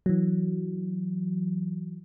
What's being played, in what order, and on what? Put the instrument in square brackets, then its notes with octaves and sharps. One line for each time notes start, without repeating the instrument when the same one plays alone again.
[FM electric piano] E3 F#3